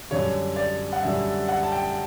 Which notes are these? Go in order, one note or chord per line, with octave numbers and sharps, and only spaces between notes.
F#2 D3 G3 C#5
D5
F#5
F#2 D3 G3 E5
F#5
A5
G5